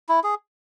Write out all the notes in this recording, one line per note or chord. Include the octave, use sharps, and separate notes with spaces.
E4
G#4